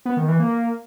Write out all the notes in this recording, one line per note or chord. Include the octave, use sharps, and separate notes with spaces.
B3
D#3
E3
A#3